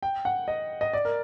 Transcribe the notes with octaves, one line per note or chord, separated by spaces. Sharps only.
G5
F#5
D#5
D#5
D5
A#4